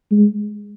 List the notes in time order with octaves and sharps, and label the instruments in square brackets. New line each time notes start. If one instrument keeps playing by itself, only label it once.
[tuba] G#3